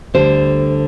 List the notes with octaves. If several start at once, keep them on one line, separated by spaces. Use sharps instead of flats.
D2 D3 G3 C5